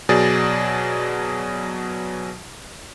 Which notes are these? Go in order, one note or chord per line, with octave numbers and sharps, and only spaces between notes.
B2 F#3 G#4 D5 A6